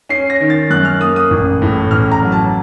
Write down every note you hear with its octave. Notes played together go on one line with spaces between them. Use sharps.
C#4 C7
A#6
D#3
A6
F#2 F#6
F6
A#3 D#6
D#6
A1
A2
A1 F6
A#5
F#3
A5